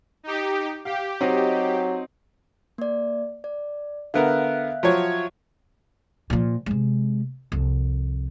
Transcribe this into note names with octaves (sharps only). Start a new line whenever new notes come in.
D#4 G4
G4 F5
F#3 C4 D#4 D#5
A#3 D5
D5
D3 B3 A#4 E5 F5 F#6
F3 F#3 C#5
A#2 F3
C3 G#3
C2 F2